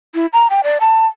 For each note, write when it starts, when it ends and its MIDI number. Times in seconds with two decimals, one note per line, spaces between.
0.15 0.26 64
0.33 0.47 82
0.50 0.61 79
0.64 0.78 74
0.81 1.06 81